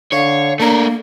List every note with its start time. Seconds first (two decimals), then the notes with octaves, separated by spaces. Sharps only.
0.12 D3 C#5 F5
0.60 A3 A#3 D4 A#4